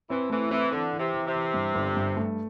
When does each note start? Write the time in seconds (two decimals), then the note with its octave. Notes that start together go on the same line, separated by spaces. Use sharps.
0.10 E3 C4
0.30 E3 A3
0.50 E3 C4
0.72 D3 E3
0.93 E3
0.99 C3
1.13 E3
1.27 C3
1.34 E3
1.54 G2
1.75 G1
1.97 G2
2.17 A3